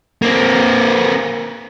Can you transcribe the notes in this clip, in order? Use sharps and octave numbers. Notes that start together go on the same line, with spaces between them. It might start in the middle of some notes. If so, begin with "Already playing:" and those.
A#3 C4